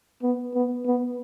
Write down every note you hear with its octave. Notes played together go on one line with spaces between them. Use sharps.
B3
B3
B3